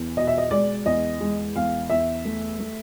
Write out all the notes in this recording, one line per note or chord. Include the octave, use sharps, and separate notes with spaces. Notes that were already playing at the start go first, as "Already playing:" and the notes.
Already playing: E2
B2 D#5
E5
D#5
G#3 D5
E2 D#5
G#3
E2 F5
E2 E5
A3
A3